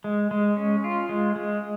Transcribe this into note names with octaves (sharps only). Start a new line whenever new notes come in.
G#3
G#3
C#4
F4
G#3
G#3